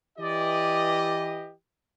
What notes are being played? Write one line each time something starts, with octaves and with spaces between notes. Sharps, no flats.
E3 G4 D5 D#5